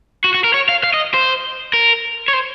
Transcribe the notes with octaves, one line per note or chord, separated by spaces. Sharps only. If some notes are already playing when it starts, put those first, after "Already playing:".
F#4
F#4
A#4
C#5
F5
F5
D#5
C5
A#4
C#5
C5